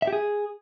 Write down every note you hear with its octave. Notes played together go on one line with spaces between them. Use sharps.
E5
G4
G#4